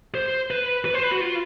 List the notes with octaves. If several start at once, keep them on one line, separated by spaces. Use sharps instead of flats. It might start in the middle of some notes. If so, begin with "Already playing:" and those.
C5
B4
B4
C5
B4
F#4
F4